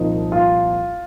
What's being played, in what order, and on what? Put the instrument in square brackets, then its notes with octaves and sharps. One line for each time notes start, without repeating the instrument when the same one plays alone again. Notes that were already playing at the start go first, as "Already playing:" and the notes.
Already playing: [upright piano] C2 A#2 F3 D#4
F4